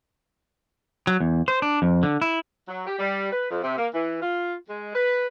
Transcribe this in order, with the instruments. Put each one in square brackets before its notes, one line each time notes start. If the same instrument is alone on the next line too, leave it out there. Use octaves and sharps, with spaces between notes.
[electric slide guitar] F#3
E2
C5
D4
F2
D3
E4
[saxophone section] F#3
G4
G3
B4
F2
C3
A#3
E3
F4
G#3
B4